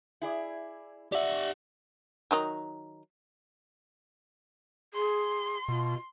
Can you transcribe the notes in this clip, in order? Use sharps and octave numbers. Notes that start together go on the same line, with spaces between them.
E4 G#4 D5
G4 D5 E5 F#5
D#3 F#3 D#4
G#4 C6
B2 F4